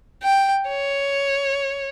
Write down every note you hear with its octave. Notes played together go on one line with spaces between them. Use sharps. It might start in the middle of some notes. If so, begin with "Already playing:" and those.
G5
C#5